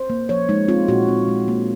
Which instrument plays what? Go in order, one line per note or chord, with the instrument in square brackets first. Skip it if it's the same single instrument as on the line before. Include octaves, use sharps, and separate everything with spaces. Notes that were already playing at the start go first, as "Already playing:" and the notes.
Already playing: [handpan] C5
A#3
F3 C#5
G#3 D#4
C4 F4
A#2 F#4
C4
G#3
A#3